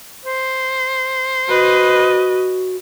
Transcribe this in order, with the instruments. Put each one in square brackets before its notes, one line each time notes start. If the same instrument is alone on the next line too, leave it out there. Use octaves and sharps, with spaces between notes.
[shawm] C5
[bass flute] F#4 [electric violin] B4 D#5